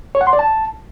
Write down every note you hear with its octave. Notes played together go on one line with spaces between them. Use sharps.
C#5
F#5
C6
D5
A5